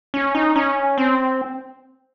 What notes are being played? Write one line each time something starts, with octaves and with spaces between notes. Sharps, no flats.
C#4
D#4
C#4
C4